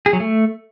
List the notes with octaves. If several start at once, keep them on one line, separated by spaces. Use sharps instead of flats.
G#4
F#3
A3